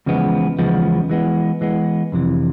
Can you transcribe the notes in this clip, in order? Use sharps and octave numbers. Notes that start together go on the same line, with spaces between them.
E2 C#3 F3 G#3 B3
E2 C#3 F3 G#3 B3
E3 G#3 B3
E3 G#3 B3
F2 C3 E3